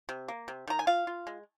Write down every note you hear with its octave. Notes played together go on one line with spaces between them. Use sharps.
C3
A#3
C3
D#3 A#5
G#5
F4 F5
F4
G#3